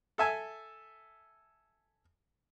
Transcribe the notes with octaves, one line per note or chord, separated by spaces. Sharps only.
A4 E5 G#5